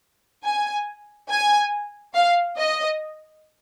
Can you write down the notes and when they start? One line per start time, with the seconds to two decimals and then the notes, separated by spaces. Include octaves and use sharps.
0.44 G#5
1.30 G#5
2.14 F5
2.57 D#5